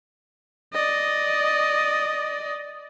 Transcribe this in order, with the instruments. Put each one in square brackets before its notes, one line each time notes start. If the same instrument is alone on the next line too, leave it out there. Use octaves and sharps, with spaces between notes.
[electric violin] D5 D#5